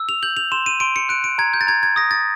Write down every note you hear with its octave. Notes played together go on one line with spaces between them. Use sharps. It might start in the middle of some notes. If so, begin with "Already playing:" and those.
Already playing: E6
F7
G6 F#7
F7
C6 E7
D#7
C6 D7
C#7
F#6 D7
D7
A#5 G#6
G6
A6
A#5 G#6
G#6
D#6 A#6
A6